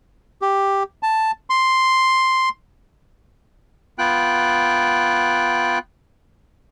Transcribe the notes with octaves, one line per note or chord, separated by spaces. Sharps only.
G4
A5
C6
B3 F4 G5 F#6